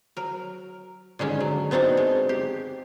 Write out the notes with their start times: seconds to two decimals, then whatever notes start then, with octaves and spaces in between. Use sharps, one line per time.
0.17 F#3 A#4
1.19 D3 D#3 G#3 C#4
1.40 F#3
1.71 B3 C4 D4 D#4 F#4
1.97 G#3
2.29 G4